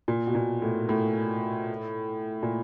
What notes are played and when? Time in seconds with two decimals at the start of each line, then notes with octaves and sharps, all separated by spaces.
0.08 A#2
0.27 B2
0.35 A#2
0.62 A2
0.89 A2
2.43 A#2